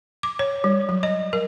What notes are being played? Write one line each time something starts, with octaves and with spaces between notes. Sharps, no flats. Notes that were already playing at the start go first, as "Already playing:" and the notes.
D6
C#5
G3
F#3
D#5
A#4